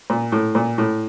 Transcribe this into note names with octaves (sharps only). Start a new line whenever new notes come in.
A#2
A2
A#2
A2